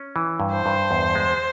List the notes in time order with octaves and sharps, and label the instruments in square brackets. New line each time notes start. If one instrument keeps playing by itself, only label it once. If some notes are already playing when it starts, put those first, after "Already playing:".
Already playing: [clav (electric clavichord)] C#4
E3
G2
[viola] C5
[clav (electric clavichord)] G2
E2
G#3